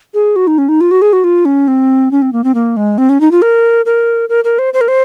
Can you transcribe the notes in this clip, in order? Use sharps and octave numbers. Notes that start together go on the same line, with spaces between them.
G#4
F#4
D#4
C#4
D#4
F4
F#4
G#4
F#4
F4
C#4
C4
C#4
C4
A#3
C4
A#3
G#3
C4
C#4
D#4
F4
A#4
A#4
A#4
A#4
C5
C5
A#4
C5